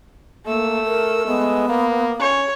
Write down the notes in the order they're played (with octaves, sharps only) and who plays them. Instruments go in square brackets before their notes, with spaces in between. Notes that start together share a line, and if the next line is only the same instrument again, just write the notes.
[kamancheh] A3 E6 [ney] A#3
[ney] A#4
[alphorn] G#3 [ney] B3
[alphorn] A#3
[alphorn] C#4 [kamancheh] C#5